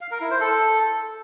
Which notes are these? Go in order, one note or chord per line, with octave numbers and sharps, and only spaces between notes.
F5
A#4
E4
C5
A4